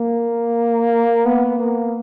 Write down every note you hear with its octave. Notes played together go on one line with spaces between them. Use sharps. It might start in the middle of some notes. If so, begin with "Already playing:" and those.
Already playing: A#3
B3
A#3